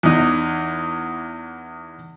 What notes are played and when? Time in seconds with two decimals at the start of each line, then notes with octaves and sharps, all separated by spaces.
0.03 E2 D#4